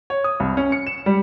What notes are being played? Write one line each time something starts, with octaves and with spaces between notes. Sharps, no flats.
C#5
D#6
C2
C#4
C#7
E7
G3